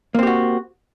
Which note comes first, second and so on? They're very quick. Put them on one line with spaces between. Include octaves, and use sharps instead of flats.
A#3 C4 G4 F#4